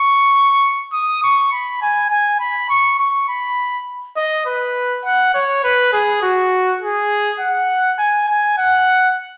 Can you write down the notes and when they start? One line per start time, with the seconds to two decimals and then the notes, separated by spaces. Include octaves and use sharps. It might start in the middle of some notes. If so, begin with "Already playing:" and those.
Already playing: C#6
0.92 D#6
1.23 C#6
1.52 B5
1.81 G#5
2.11 G#5
2.40 B5
2.70 C#6
2.99 C#6
3.28 B5
4.17 D#5
4.46 B4
5.04 F#5
5.34 C#5
5.64 B4
5.93 G#4
6.22 F#4
6.81 G#4
7.40 F#5
7.98 G#5
8.29 G#5
8.57 F#5